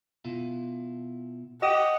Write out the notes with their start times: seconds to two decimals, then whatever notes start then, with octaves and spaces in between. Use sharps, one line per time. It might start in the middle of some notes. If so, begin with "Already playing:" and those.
0.25 B2 E4 F4
1.62 G4 D#5 F#5 D#6